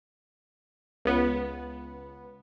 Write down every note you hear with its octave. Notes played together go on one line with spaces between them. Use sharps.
C#2 B3